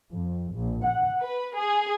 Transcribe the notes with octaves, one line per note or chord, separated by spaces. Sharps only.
F2
A#1
F#5
B4
G#4